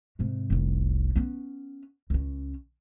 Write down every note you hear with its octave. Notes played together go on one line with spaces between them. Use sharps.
G#2 C3
F1 C2
B3 C#4
C#2 C#4